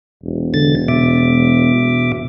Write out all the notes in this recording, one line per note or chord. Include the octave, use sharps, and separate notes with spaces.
E1
D3 A6
B2 E5 D6
E1